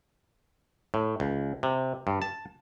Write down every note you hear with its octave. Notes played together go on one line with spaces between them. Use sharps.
A2
C#2
C3
G2
A5